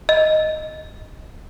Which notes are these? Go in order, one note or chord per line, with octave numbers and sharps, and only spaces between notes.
D#5